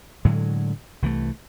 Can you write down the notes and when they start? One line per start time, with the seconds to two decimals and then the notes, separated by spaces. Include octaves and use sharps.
0.25 A2 D3 F#3 G#3
1.02 C2 E3 G3 A3